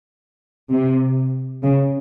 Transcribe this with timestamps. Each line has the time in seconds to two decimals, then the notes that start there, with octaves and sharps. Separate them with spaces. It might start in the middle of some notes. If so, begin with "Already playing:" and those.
0.71 C3
1.64 C#3